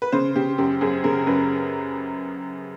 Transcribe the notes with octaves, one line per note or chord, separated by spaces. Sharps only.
B4
C#3 C5
C#3 G4
F#2 G4
F#2 G#4
C#3 A#4
F#2 B4